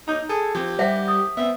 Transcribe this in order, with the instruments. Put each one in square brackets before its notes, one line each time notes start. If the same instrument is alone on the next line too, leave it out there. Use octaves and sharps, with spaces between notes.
[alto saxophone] D#4 [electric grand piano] A#5 G6
[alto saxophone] G#4 [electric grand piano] A4
[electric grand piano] F3 C4 [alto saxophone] G4
[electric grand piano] G3 B6 [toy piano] C5 E5 F#5
[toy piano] D#6
[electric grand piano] B3 C4 [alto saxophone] E5